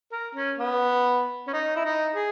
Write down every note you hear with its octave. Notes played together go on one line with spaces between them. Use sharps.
A#4
C#4
B3
C#4
D#4
E4
D#4
G#4